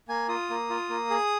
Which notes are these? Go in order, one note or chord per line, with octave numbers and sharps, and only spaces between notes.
A#3 G#5
F4 D#6
A#3
F4
A#3
G#4